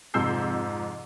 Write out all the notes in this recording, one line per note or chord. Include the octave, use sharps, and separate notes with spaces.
F2 G#2 C3 E6 G6 C7